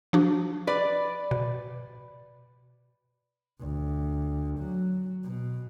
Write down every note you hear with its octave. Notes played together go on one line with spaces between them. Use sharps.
F3 D4 F#4
B4 D5
B2
D2
F#3
B2